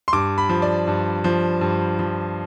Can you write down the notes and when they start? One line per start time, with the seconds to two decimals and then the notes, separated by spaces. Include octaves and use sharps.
0.08 C6
0.13 G2 D6
0.38 B5
0.49 F3
0.62 D5
0.88 G2
1.24 F3
1.61 G2
1.99 F3